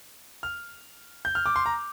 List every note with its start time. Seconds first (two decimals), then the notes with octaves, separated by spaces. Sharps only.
0.43 F6
1.25 G6
1.35 F6
1.46 D6
1.56 C6
1.66 A#5